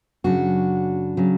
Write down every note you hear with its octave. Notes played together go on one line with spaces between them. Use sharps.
F#2 C#3 F#3 D4 F#4
C#3 F#3